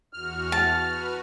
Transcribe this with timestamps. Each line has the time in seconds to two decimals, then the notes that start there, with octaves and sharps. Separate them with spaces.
0.13 E2 F#4 F6
0.52 A5
0.85 F#4 B4